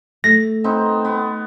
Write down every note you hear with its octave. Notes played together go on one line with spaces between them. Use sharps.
A3 A#6
B3 C4 D#4
B3